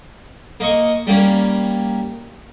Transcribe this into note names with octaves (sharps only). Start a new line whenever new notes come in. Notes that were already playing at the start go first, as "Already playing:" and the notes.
A#3 D#5 C#6
G3 A#3 C#4